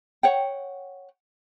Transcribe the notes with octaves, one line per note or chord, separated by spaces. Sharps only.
C#5 F#5 G5